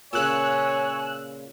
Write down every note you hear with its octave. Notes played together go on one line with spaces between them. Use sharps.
A#2 C#3 C#5 G#5 E6 F#6